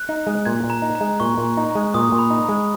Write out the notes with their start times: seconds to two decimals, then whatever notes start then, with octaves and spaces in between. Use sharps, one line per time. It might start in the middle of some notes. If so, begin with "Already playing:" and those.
Already playing: F#6
0.09 D#4
0.27 G#3
0.45 A#2 G#6
0.64 A#2
0.70 A#5
0.82 D#4
0.95 A#5
1.01 G#3
1.20 A#2 C#6
1.38 A#2
1.57 D#4
1.75 G#3
1.94 A#2 D#6
2.12 A#2
2.19 B5
2.30 D#4
2.49 G#3